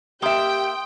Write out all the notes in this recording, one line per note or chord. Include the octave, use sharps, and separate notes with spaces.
A#3 G4 E5 G5 C6 D#6 G7